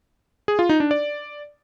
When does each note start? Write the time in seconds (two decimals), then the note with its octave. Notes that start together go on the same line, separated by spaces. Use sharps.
0.48 G#4
0.59 F4
0.69 D#4
0.80 D4
0.91 D5